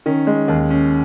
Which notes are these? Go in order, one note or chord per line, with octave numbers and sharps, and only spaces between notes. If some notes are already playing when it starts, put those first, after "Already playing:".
D#3 C#4
G#3
D#2
C#4